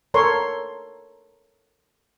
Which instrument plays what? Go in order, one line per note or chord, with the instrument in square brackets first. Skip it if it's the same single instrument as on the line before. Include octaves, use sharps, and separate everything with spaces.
[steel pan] A4 A#4 C#5 C6